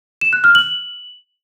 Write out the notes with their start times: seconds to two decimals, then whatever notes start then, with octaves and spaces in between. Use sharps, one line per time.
0.21 E7
0.33 F#6
0.44 F6
0.55 F#7